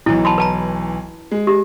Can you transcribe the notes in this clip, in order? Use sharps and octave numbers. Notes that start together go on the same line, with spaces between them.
B1 E3 E4
A5 B5 C6
B4 A5 A#5
G#3
G4